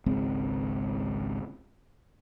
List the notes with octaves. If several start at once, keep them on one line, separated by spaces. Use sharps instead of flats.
G#1 C#2 G#3 C4